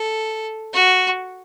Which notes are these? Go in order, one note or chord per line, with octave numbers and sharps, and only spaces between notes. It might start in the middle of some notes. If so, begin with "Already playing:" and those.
Already playing: A4
F#4